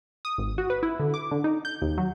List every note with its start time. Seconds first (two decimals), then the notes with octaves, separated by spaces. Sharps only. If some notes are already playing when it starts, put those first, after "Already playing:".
0.25 D#6
0.38 G#1
0.58 F#4
0.70 B4
0.83 E4
0.99 D3
1.14 D6
1.31 D3
1.44 D#4
1.65 G6
1.82 D#2
1.98 F#3